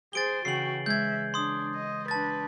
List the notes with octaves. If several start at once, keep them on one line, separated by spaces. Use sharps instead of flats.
G#4 C5 A6 D7 G7
C#3 E3 F#4 G5 C7 F#7
G#3 E5 G6 G#6
D4 C6 D#6
D#5
D4 B4 A5 A6